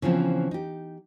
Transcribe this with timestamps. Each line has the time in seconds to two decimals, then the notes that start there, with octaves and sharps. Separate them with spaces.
0.02 C#3 E3 F3 B3 C4
0.51 D#4 G4